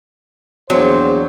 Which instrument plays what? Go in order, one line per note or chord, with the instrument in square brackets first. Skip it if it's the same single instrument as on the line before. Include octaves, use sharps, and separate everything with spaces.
[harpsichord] A#1 E2 G5 [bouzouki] F#3 [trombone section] C5